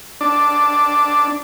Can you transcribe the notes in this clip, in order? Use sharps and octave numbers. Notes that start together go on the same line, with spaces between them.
D4